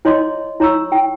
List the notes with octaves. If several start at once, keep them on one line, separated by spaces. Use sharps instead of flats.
E4 C#5 D#5 C6 D6
E4 C#5 A#5 C#6 E6
E4 G5